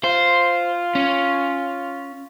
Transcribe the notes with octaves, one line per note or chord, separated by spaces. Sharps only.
F4 C5
C#4